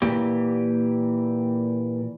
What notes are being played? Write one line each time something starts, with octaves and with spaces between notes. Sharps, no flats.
A#2 E3 G4